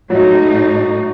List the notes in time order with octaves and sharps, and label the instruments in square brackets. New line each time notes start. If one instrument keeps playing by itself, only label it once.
[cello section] A2 D#4 [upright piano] F#3